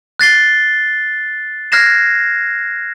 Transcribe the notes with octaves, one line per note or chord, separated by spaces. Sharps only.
F#6 A6 C7 G7
F6 F#6 G#6 A#6 C7 E7